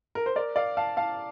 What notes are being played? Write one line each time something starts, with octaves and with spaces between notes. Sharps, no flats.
A#4
C5
A#4 D5
D5 F5
F5 A5
F5 A5